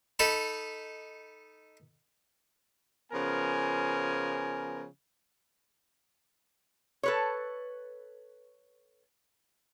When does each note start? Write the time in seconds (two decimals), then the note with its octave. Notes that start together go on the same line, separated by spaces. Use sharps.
0.19 D#4 A4 B5
3.12 C#3 F3 B3 A#4 G#5
7.03 A4 B4 C#5